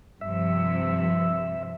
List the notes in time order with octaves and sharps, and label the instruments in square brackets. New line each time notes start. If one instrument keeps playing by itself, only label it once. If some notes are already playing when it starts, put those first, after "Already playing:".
[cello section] G2 C3 F3 [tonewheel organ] E5